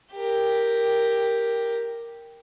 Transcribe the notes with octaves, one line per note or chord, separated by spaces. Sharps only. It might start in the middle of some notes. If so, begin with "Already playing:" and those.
G4 A#4